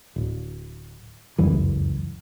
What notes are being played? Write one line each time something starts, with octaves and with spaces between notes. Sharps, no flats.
D1
F1 C#2 F#2 E3